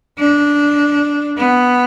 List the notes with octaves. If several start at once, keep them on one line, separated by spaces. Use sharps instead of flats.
D4
B3